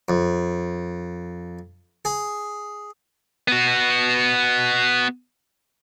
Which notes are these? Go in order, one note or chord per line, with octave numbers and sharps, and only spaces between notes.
F2
G#4
B3 F#4